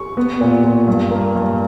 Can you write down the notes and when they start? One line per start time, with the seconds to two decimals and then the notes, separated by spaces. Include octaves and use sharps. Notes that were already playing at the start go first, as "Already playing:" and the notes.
Already playing: C#6
0.17 B3
0.41 A#2
0.64 A#2
0.88 G2
1.11 A#3
1.35 G2